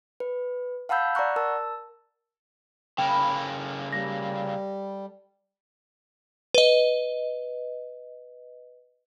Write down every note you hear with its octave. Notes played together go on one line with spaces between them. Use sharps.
B4
F5 F#5 A5 B5 E6 G6
D5 F#5 A#5 C#6 F#6
A#4 A5 E6
C#3 A#3 A4 E5 G5 B5
G3 A#6
B4 D#5